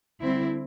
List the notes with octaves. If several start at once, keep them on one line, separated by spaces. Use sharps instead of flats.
D2 D3 G3 C4 E4